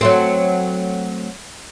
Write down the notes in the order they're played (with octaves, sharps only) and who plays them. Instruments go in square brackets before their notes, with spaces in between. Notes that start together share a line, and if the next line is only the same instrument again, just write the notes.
[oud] F#3 A3 C4